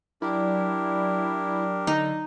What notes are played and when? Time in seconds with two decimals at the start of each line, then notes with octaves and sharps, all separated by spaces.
0.22 F#3 D4 E4 G4 A#4 D5
1.87 D3 D#4